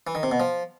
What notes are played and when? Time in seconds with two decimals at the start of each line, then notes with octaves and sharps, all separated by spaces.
0.07 E3
0.15 D#3
0.23 C3
0.31 B2
0.40 F3